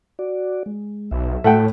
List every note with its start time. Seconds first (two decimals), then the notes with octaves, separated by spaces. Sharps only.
0.19 F#4 D5
0.66 G#3
1.11 B1 E5
1.44 A2 A3 F#5 G5